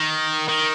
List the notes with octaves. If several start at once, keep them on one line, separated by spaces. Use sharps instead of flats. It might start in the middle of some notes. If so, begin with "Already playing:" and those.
Already playing: D#3
D#3